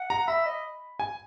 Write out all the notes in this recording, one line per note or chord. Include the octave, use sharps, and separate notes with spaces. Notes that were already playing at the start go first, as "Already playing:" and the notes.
Already playing: F#5
A#5
E5 B5
D#5
G#5